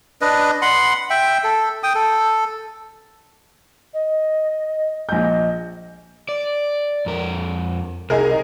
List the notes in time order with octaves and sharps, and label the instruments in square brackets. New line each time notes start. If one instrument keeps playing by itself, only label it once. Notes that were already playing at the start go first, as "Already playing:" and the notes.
[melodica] D4 B4 D#5
F#5 B5 C6
E5 G5
A4
G5 D#6
A4
[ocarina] D#5
[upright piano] A#1 G6 [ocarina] D#5
[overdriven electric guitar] D5
F2 A#4
[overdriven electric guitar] C2 [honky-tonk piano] D#4 G#4 A#4